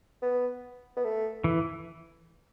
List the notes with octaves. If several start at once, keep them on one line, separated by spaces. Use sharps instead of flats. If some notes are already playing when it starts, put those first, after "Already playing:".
B3
B3
A3
E3